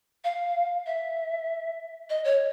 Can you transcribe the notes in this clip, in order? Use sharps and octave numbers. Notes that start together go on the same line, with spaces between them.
F5
E5
D#5
C#5